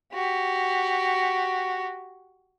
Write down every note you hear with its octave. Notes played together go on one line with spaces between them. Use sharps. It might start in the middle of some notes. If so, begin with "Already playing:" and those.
F#4 G4